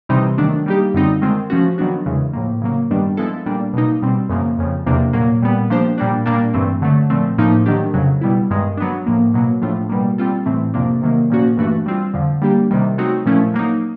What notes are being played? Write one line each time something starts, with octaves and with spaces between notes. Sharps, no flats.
C3 E3 G3 C4 D#4
D#3 F#3 A3 D4
G3 A#3 D#4 G4
F#2 D3 G3 C4 D#4
D#3 G#3 C4 F4
F3 A3 C#4 F#4
D#3 F#3 B3 D4 F#4
E2 C#3 E3 G#3
A2 F3 A#3
C#3 F#3 A#3
G2 D#3 G3 B3 D4
F3 G#3 B3 E4 A4
A#2 G3 A#3 D4
B2 F#3 A#3 D#4
B2 G3 C4
F#2 C#3 F3 A#3
F2 C#3 F3
E2 C3 F3 A#3 D4
A#2 F#3 A#3
A#2 G3 B3
F3 A#3 D4 G4 C5
A#2 G3 A#3 D4
A#2 G3 A#3 D4
G2 E3 A3 C4
D3 F#3 A3
A#2 F3 A3 C4
A2 F3 A#3 D#4
D#3 F#3 A3 D4 G4
F2 C#3 F#3
B2 G3 B3 E4
G2 D#3 G#3
F#3 B3 D4
A2 F3 A#3
B2 F#3 A#3
A2 F3 A3 D4 F4
B2 G3 A#3
G3 C4 F4 A4
A2 E3 A3 C4
F2 C3 F3 A#3 D4
C3 D#3 F#3 A#3
A#2 F3 A#3 C#4 F#4
G2 E3 A3 D4 F#4
G3 C4 F4
F2 D3 F3
G3 A#3 D4 G4
C3 D#3 G3
F#3 A3 C4 D#4 F#4
A#2 F3 A3 C#4 E4
F#3 A#3 D#4